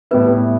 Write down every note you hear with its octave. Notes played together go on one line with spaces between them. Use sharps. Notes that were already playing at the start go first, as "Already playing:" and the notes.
A2 G3 B3 E4 B4